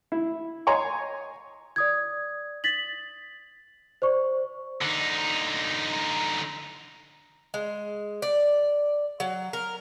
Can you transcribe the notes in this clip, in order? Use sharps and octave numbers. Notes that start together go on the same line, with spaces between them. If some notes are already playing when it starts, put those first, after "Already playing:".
E4
C#5 D#5 G#5 A#5 C6 C#6
D5 D#6 G#6
A6 B6 F#7
C5 D5 C#6
D3 D#4
G#3
D5
F#3
A#4